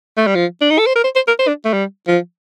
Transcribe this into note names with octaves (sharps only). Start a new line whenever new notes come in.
A3
G3
F3
D4
D#4
A4
C5
A#4
C5
C5
A#4
C5
D4
A3
G3
F3